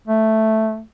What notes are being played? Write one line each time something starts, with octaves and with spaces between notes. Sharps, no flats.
A3